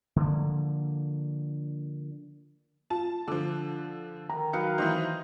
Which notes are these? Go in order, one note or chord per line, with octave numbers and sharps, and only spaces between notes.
D3 F3 A#3
F4 A5
D3 F3 D6
D#3 A#5
F#3 D#4 B4 F5 C#7
E3 D#4 C5 D#5